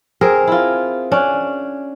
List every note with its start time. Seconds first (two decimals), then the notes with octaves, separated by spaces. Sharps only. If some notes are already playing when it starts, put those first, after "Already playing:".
0.21 C4 G#4 A#4
0.47 E4 F4
1.12 C#4 D4